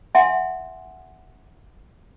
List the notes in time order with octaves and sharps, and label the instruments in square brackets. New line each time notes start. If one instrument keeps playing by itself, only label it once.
[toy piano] E5 F#5 G#5 C6